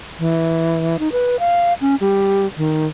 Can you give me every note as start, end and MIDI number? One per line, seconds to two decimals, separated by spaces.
0.20 0.97 52
0.99 1.11 63
1.12 1.39 71
1.39 1.73 77
1.81 1.95 61
2.01 2.46 55
2.57 2.86 51